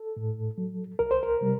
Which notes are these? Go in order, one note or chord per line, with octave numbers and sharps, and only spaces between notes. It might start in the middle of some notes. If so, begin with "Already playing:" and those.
Already playing: A4
A2
F#3
C2 A#4
C5
A#4
C3 G3